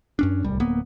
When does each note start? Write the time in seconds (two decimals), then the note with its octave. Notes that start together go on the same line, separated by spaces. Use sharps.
0.19 F#2 C#4 D4
0.44 D1 C2 G3
0.60 D1 A#3 B3